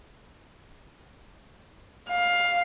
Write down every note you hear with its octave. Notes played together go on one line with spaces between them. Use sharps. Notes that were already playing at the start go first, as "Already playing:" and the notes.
F5